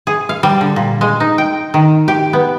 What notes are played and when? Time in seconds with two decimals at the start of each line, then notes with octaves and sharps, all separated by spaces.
0.07 G#4
0.29 F5
0.43 G3
0.61 D3
0.76 A#2
1.01 G#3
1.20 D#4
1.38 G5
1.74 D#3
2.08 G4
2.33 B3